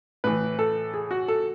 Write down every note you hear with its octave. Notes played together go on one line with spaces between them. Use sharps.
A2 E3 B4
A4
G#4
F#4
A4